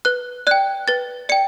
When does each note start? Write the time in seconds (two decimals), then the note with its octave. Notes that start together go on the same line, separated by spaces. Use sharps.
0.05 B4 F#6
0.47 D5 G5 F#6
0.88 B4 A6
1.29 D5 G5 C#7